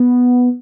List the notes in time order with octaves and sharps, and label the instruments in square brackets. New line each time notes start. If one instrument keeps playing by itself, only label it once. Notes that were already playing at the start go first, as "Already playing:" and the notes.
Already playing: [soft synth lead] B3